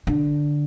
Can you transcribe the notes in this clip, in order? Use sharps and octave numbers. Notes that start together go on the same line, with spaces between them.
D3